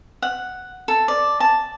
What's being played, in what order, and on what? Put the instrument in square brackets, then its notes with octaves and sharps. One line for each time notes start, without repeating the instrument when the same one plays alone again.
[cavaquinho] F#5
A4
D5
A5